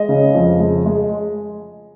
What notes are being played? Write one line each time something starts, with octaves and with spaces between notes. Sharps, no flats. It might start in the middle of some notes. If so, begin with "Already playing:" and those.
Already playing: G#3 D#5
C#3
F2
G#3
G#3